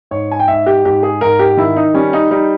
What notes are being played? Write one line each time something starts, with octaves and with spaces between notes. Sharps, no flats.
G#2 C#5
G#5
G5
G#2 E5
G4
G#2 G4
G#4
G#2 A#4
G4
D#3 E4
D#4
G3 C#4
D#4
G3 D#4